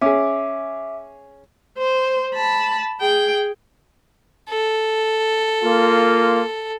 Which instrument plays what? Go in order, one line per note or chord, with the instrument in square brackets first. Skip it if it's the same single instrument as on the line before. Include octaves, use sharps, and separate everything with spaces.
[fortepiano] C#4 G#4 [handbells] E5 D6
[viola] C5
A5 B5
G#4 G5
[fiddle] A4
[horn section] A#3 F4